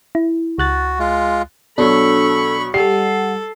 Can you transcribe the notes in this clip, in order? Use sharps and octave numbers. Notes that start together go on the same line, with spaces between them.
E4
C#2 F#4 F#6 A6
G#3 F4
B2 F#3 D4 A4 B5 C#6
G3 A4 F#5 C7